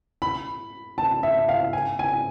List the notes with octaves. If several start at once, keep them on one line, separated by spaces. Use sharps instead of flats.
B5
A5
E5
F5
G#5
G#5